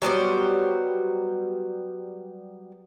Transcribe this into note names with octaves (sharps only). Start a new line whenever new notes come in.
F#3 G3 B3 C5